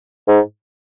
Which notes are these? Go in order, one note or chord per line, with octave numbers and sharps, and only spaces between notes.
G#2